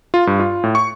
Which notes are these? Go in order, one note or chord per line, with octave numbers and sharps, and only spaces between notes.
F4
G2
F4
A2
C#6